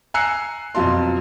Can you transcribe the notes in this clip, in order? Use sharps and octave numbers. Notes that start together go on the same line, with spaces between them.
G#5 A#5 E6 F#6 C7 C#7
F2 B2 F#3 F4 A5 C6